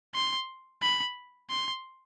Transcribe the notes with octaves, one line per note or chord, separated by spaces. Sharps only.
C6
B5
C6